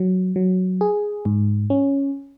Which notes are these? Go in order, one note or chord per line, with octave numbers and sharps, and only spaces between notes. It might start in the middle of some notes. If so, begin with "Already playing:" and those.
Already playing: F#3
F#3
G#4
G#2
C#4